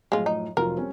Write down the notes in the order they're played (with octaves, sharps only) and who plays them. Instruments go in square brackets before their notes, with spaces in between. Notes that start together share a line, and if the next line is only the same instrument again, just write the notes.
[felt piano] F#2 A2 F3 [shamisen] G#3 F4
[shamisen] D#4
[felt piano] F1 F#3 F4 [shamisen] A#4
[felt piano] G3 C4 C#4